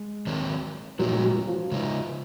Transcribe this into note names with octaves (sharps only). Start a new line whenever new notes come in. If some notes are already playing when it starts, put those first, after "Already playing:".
Already playing: G#3
D#3 F#3 C4
A#2 F3 F#3 A#3 D#4
G#3
F#3
F#3
F3
C#3 G#3 D#4